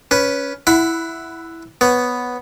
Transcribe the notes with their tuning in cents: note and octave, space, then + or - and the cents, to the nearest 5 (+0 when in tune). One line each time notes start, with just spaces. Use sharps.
C#4 +15 B4 +0
E4 +0 F#5 +0 B5 +30
B3 +0 C#5 +0